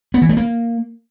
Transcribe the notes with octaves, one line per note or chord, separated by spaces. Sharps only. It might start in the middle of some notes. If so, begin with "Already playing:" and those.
B3
E3
A3
A#3